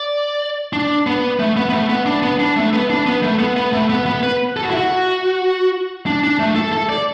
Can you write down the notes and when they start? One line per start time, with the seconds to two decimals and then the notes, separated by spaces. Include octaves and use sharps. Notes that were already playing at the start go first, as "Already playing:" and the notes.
Already playing: D5
0.73 D4
1.07 B3
1.40 A3
1.57 B3
1.69 B3
1.73 A3
1.89 B3
2.06 D4
2.23 B3
2.39 D4
2.56 A3
2.73 B3
2.90 D4
3.07 B3
3.23 A3
3.39 B3
3.57 B3
3.73 A3
3.90 B3
4.06 B3
4.23 B4
4.57 A4
4.63 F#4
4.70 E4
4.77 F#4
6.06 D4
6.24 D4
6.39 A3
6.56 A4
6.73 A4
6.89 D5